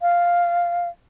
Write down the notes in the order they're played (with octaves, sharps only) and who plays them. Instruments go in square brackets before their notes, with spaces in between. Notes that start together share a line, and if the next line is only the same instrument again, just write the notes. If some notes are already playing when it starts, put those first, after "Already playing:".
[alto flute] F5